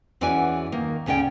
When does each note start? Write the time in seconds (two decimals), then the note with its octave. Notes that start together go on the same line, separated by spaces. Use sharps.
0.21 E2 E3 C#4 F#4 D5 G#5
0.72 D#3 A#3
1.06 D2 C#3 C#4 D5 G5